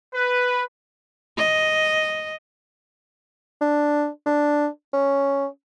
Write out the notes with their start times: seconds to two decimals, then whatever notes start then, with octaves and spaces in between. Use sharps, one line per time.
0.14 B4
1.38 D#5
3.61 D4
4.26 D4
4.93 C#4